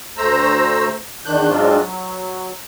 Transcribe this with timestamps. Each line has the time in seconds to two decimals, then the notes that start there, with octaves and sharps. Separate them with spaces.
0.17 D2 A3 C5 A#5 E6
1.25 E2 D#3 D4 F#6 G6
1.49 G#2 F#3 G#3 C4 D4 F4
1.77 F#3